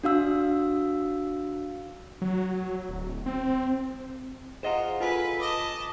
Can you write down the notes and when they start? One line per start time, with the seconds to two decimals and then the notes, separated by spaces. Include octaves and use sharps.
0.04 D4 F#4 F5 E6
2.22 F#3
2.89 D1
3.26 C4
4.63 F4 G#4 C5 D#5 F#5 A#5
5.00 F4 A4 B4 G#5 B6
5.41 D#5 A5 D6